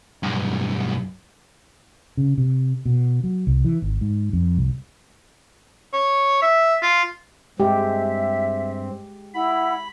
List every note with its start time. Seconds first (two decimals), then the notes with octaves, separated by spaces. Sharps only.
0.23 B1 G2
2.17 C#3
2.38 C3
2.86 B2
3.24 F#3
3.47 C2
3.65 E3
3.82 G#1
4.01 G#2
4.33 F2
4.57 C2
5.94 C#5
6.42 E5
6.82 F4
7.60 G2 G#3 C4 G4 E5
9.34 E4 F#5 B5